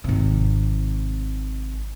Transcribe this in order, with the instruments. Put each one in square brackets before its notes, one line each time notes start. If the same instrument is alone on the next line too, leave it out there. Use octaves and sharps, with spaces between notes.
[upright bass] G#1 C3